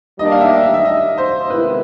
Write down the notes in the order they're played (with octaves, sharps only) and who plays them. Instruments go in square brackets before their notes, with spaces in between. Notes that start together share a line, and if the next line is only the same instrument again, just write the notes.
[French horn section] G3 A#3 D4 [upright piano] D#5
[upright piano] F5
E5
E5
E5
D#5
C5
[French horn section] C3 D#3 G#3 B3 E4 [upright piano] B4